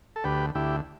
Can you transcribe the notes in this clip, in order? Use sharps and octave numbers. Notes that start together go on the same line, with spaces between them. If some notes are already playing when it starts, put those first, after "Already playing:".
A4
D2 G4 B4
D2 E4 G4